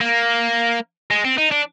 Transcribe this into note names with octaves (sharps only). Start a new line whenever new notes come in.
A#3
G#3
C4
D#4
D4